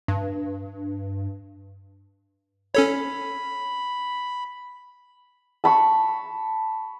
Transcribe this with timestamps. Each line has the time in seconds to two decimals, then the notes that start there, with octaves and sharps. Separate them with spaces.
0.08 G2
2.75 C#4 A4 C#5 B5
5.64 A5 B5 C#6